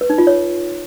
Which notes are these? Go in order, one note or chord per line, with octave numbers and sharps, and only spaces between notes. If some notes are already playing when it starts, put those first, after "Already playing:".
B4
D#4
F4
C#5